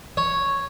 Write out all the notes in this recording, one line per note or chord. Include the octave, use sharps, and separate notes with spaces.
C#5